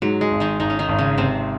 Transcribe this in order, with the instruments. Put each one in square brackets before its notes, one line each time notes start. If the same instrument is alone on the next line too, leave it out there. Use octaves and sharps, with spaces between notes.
[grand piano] G#2 [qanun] F#3
[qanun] G#3
[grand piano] G#1
[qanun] D#3 D#4
[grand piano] G#1 [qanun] D#3 D#4
[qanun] C#4
D#3 D#4
[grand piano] G#1
[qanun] C#3 C#4
[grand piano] G#1 [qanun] C3 C4